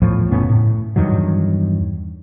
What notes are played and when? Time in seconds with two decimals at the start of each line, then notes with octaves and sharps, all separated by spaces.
0.02 E2 A2 F3
0.31 F#1 A2 B3 C#4
0.49 A2
0.96 E2 G2 D#3 F#3